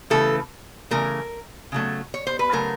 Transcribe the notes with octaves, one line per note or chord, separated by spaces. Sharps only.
C#3 E3 A3 A4
C#3 E3 A3 A#4
C#3 F#3 A3
C#5
C5
B4
C#3 F#3 A3 A#4